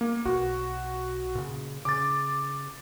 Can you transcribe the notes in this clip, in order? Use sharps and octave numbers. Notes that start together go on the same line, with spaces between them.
A#3
B1 F#4
A#2 C#3
C#3 D6 A6